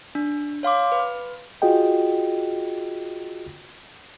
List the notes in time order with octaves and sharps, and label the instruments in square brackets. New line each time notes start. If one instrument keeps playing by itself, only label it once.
[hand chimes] D4
C#5 F5 C6 D6
B4
[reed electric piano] F4 F#4 G#4 D#5 G5